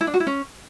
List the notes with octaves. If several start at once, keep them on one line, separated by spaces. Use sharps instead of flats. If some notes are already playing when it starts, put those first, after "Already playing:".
E4
D4
F#4
E4
C#4